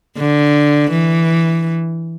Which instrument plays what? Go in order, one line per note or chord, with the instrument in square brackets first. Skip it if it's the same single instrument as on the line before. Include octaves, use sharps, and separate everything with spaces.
[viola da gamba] D3
E3